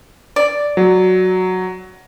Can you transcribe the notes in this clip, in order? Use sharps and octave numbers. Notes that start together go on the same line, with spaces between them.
D5
F#3